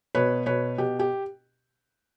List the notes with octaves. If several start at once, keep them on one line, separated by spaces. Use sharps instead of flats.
B2 B4 C#5
B2 B4 C#5
B2 G4
G4